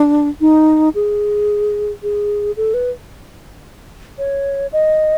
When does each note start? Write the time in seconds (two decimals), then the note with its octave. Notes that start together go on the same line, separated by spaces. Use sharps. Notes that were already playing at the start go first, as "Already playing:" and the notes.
Already playing: D4
0.41 D#4
0.95 G#4
2.03 G#4
2.57 A4
2.74 B4
4.18 C#5
4.73 D#5